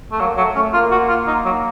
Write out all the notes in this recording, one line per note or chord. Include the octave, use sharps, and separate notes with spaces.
A3
F#3 A#3
F#3 A3
A3 C#4
A#3 F4
F#4
F4
D#4
F#3